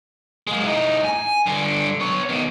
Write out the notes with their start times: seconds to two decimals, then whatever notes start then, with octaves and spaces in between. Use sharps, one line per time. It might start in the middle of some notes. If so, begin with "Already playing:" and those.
0.47 G#3 A#3
0.63 A2 D#4
1.04 G#5
1.47 G2 D3
2.00 B3 C#5
2.29 B2 D#3